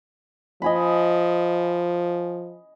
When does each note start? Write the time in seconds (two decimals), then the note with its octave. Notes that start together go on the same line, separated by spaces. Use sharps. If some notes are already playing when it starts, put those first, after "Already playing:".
0.62 F3 D#5 G#5 B5